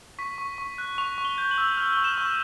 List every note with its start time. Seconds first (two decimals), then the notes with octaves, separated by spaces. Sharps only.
0.19 C#6 B6
0.38 C#6
0.58 C#6
0.78 F#6
0.98 C#6 F7
1.18 C#6
1.25 G7
1.38 G6
1.51 F#7
1.58 E6
1.77 F6 F7
1.97 C#6
2.04 E7
2.18 C#6